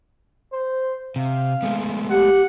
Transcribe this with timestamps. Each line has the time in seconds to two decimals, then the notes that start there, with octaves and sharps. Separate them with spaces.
0.53 C5
1.16 C3 F5
1.63 G#3 A3 B3
2.11 G4 F#5